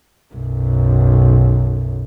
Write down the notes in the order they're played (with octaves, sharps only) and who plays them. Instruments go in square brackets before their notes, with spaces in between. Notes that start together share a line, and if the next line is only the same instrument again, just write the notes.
[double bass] B1 F#2